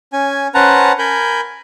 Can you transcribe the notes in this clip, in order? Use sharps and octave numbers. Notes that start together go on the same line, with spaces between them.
C#4 G#5
C#4 B4 C5 F#5 A5 A#5
A#4 G#5 B5 G6